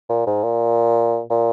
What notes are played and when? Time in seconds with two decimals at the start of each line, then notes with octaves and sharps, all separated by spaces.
0.09 A#2
0.27 G#2
0.43 A#2
1.30 A#2